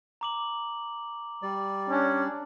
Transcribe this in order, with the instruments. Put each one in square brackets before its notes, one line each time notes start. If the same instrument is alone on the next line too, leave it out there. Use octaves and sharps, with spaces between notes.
[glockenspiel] A#5 D6 F#7
[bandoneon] G3 D5
[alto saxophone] C#4 [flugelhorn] D4